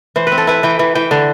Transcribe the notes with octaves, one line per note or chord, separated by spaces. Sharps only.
E3 C5
B4
C4
A4
E4 B4
E3 G5
E3
E3 G5
D3